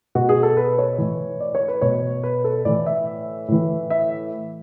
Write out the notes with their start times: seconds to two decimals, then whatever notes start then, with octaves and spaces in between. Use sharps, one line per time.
0.15 B2 F#4
0.29 G#4
0.43 A4
0.57 B4
0.78 C#5
0.98 A2 E3
1.41 D5
1.55 C#5
1.68 B4
1.81 B2 C#5
2.24 B4
2.44 A4
2.65 A2 E3 D5
2.86 E5
3.48 A2 E3
3.90 E5